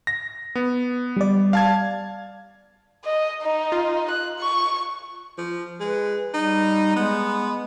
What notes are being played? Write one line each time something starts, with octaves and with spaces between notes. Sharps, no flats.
A#6
B3
G3 D5
F5 A5 G#6
D#5
D#4
F4
F#6
C#6
F3
G#3 B4
G3 D#4
G#3 B3